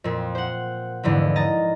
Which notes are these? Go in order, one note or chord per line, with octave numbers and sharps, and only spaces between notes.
F2 A#2
C5 F#5
E2 G#2 D3 F3
D#5 A#5 A6